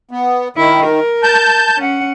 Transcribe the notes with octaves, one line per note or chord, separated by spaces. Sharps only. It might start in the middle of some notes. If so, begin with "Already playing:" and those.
B3
D#3 E4
A#4
A5 G6
C#4 F#5